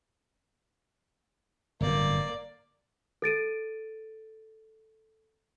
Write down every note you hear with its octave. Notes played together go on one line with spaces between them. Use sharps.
G1 F#2 A2 A#3 D5
A4 A6 D7 D#7